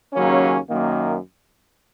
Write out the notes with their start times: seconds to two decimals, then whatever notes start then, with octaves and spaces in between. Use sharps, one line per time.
0.13 D#2 C#3 F#3 A#3 C#4
0.70 F#2 D#3 A#3